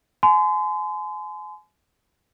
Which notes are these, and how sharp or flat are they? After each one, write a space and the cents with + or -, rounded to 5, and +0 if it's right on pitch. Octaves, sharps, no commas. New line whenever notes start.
G#5 +35 C6 -35